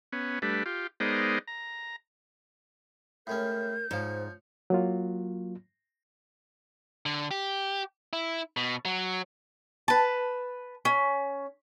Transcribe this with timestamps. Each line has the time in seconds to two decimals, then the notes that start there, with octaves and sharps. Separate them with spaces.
0.13 B3 C#4
0.42 G3 A3 D4 B4
0.66 F4 G4
1.00 G#3 B3 D#4 A#4 C5 D5
1.48 A#5
3.27 A2 G#3 C#4 A#4 G6
3.91 G#2 F3 C5 C#5
4.70 F#3 A#3 F4
7.06 D3
7.31 G4
8.13 E4
8.57 B2
8.85 F#3
9.88 B4 A5
10.85 C#4